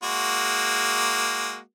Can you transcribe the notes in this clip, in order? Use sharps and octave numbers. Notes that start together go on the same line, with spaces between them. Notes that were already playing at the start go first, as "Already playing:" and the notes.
G#3 A#3 F#4